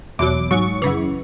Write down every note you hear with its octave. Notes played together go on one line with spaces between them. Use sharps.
E2 B2 F#3 D6
G#2 F#3 C#6
F#2 C#3 E3